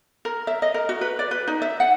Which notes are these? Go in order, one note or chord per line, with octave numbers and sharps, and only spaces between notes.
A#4
E5
D#5
A#4
F#4
B4
D5
B4
D#4
E5
F#5